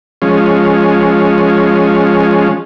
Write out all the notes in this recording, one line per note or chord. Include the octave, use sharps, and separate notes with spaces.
F3 G#3 C#4